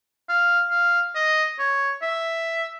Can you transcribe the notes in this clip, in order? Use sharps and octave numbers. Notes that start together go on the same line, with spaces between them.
F5
F5
D#5
C#5
E5